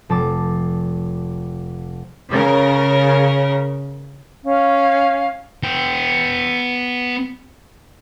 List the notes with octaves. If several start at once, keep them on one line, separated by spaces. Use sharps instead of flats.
F1 A5 D6
C#3 A#4
C#4 F5
B3 G5